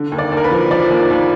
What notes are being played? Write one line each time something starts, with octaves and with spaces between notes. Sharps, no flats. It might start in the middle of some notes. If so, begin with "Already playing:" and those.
Already playing: D3
D#2
D5
D#2
A#4
B4
F3
F3 D5
D#2
D#2